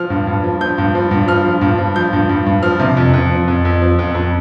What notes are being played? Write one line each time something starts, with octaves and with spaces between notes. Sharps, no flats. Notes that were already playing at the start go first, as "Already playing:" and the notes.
Already playing: F3 F6
G2
G2
F3
F3 G6
G2
F3
G2
F3 F6
F3
G2
F3
F3 G6
G2
G2
G2
F3 F6
C3
F2
F2
F3
F2
F2
F3
F2
F2